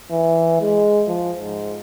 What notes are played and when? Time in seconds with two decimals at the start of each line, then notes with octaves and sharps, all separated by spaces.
0.11 E3
0.61 G#3
1.08 F3
1.39 G#2